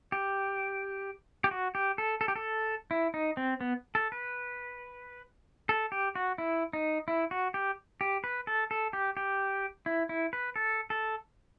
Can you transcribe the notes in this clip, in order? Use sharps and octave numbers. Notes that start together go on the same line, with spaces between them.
G4
G4
F#4
G4
A4
A4
G4
A4
E4
D#4
C4
B3
A4
B4
A4
G4
F#4
E4
D#4
E4
F#4
G4
G4
B4
A4
A4
G4
G4
E4
E4
B4
A4
A4